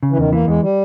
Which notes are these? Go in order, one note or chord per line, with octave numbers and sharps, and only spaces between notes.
C#3
E3
E2 D#3
E3 A#3
E2 G#3
G3